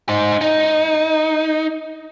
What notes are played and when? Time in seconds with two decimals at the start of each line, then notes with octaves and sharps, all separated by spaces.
0.09 D#4 C5
0.41 D#4